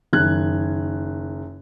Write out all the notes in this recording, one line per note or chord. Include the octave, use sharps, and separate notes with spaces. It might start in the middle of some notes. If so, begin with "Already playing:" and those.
F#1 D#3 F#6 G#6